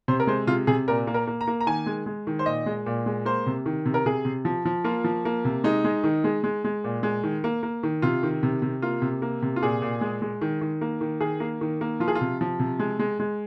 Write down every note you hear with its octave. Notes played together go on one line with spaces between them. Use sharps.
C3 C5
A#4
G#3 C5
C3 F4
C3 G#4
A#2 A#4
A#3
A#4
A#3
A#5
A#3
A#5
D#3 G#5
G#3
G#3
D#3
C5
A#2 D#5
G#3
A#2
G#3
A#3 C5
C3
D#3
C3
A#4
C3 G#4
C3
F3
F3
A#3 F4
F3
A#3
C3
G#3 D#4
G#3
D#3
G#3
G#3
G#3
A#2
G#3
D#3
A#3
A#3
D#3
C3 F4
D#3
C3
C3
A#3 F4
C3
A#3
C3
F4
A#2 G#4
A#2
G#3
G#3
D#3
D#3
A#3
D#3
D#3 G#4
A#3
D#3
A#3
F3 F4
G#4
F4
C3
F3
C3
G#3
G#3
G#3